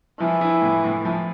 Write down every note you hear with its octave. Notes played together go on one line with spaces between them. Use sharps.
E3 F3
E4
A2
A2
F3